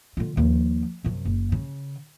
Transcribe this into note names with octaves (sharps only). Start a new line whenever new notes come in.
D3 F4
D#2 F3
F#2 C3
F#1
C#3